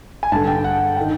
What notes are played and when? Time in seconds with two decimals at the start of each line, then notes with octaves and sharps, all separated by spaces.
0.23 G#5
0.32 G2 D3 A5
0.47 G5
0.64 F#5
0.96 D#3 G5